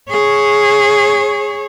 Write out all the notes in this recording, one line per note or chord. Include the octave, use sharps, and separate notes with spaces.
G#4 C#5